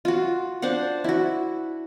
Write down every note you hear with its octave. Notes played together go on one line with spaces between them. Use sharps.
F4 F#4
D4 C5 F5 F#5
E4 F#4